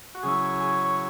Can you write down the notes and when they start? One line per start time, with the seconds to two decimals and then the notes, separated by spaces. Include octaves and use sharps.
0.15 F#4
0.23 C#3 F#3 C#4 E4 G#4
0.60 G#4
0.85 C#5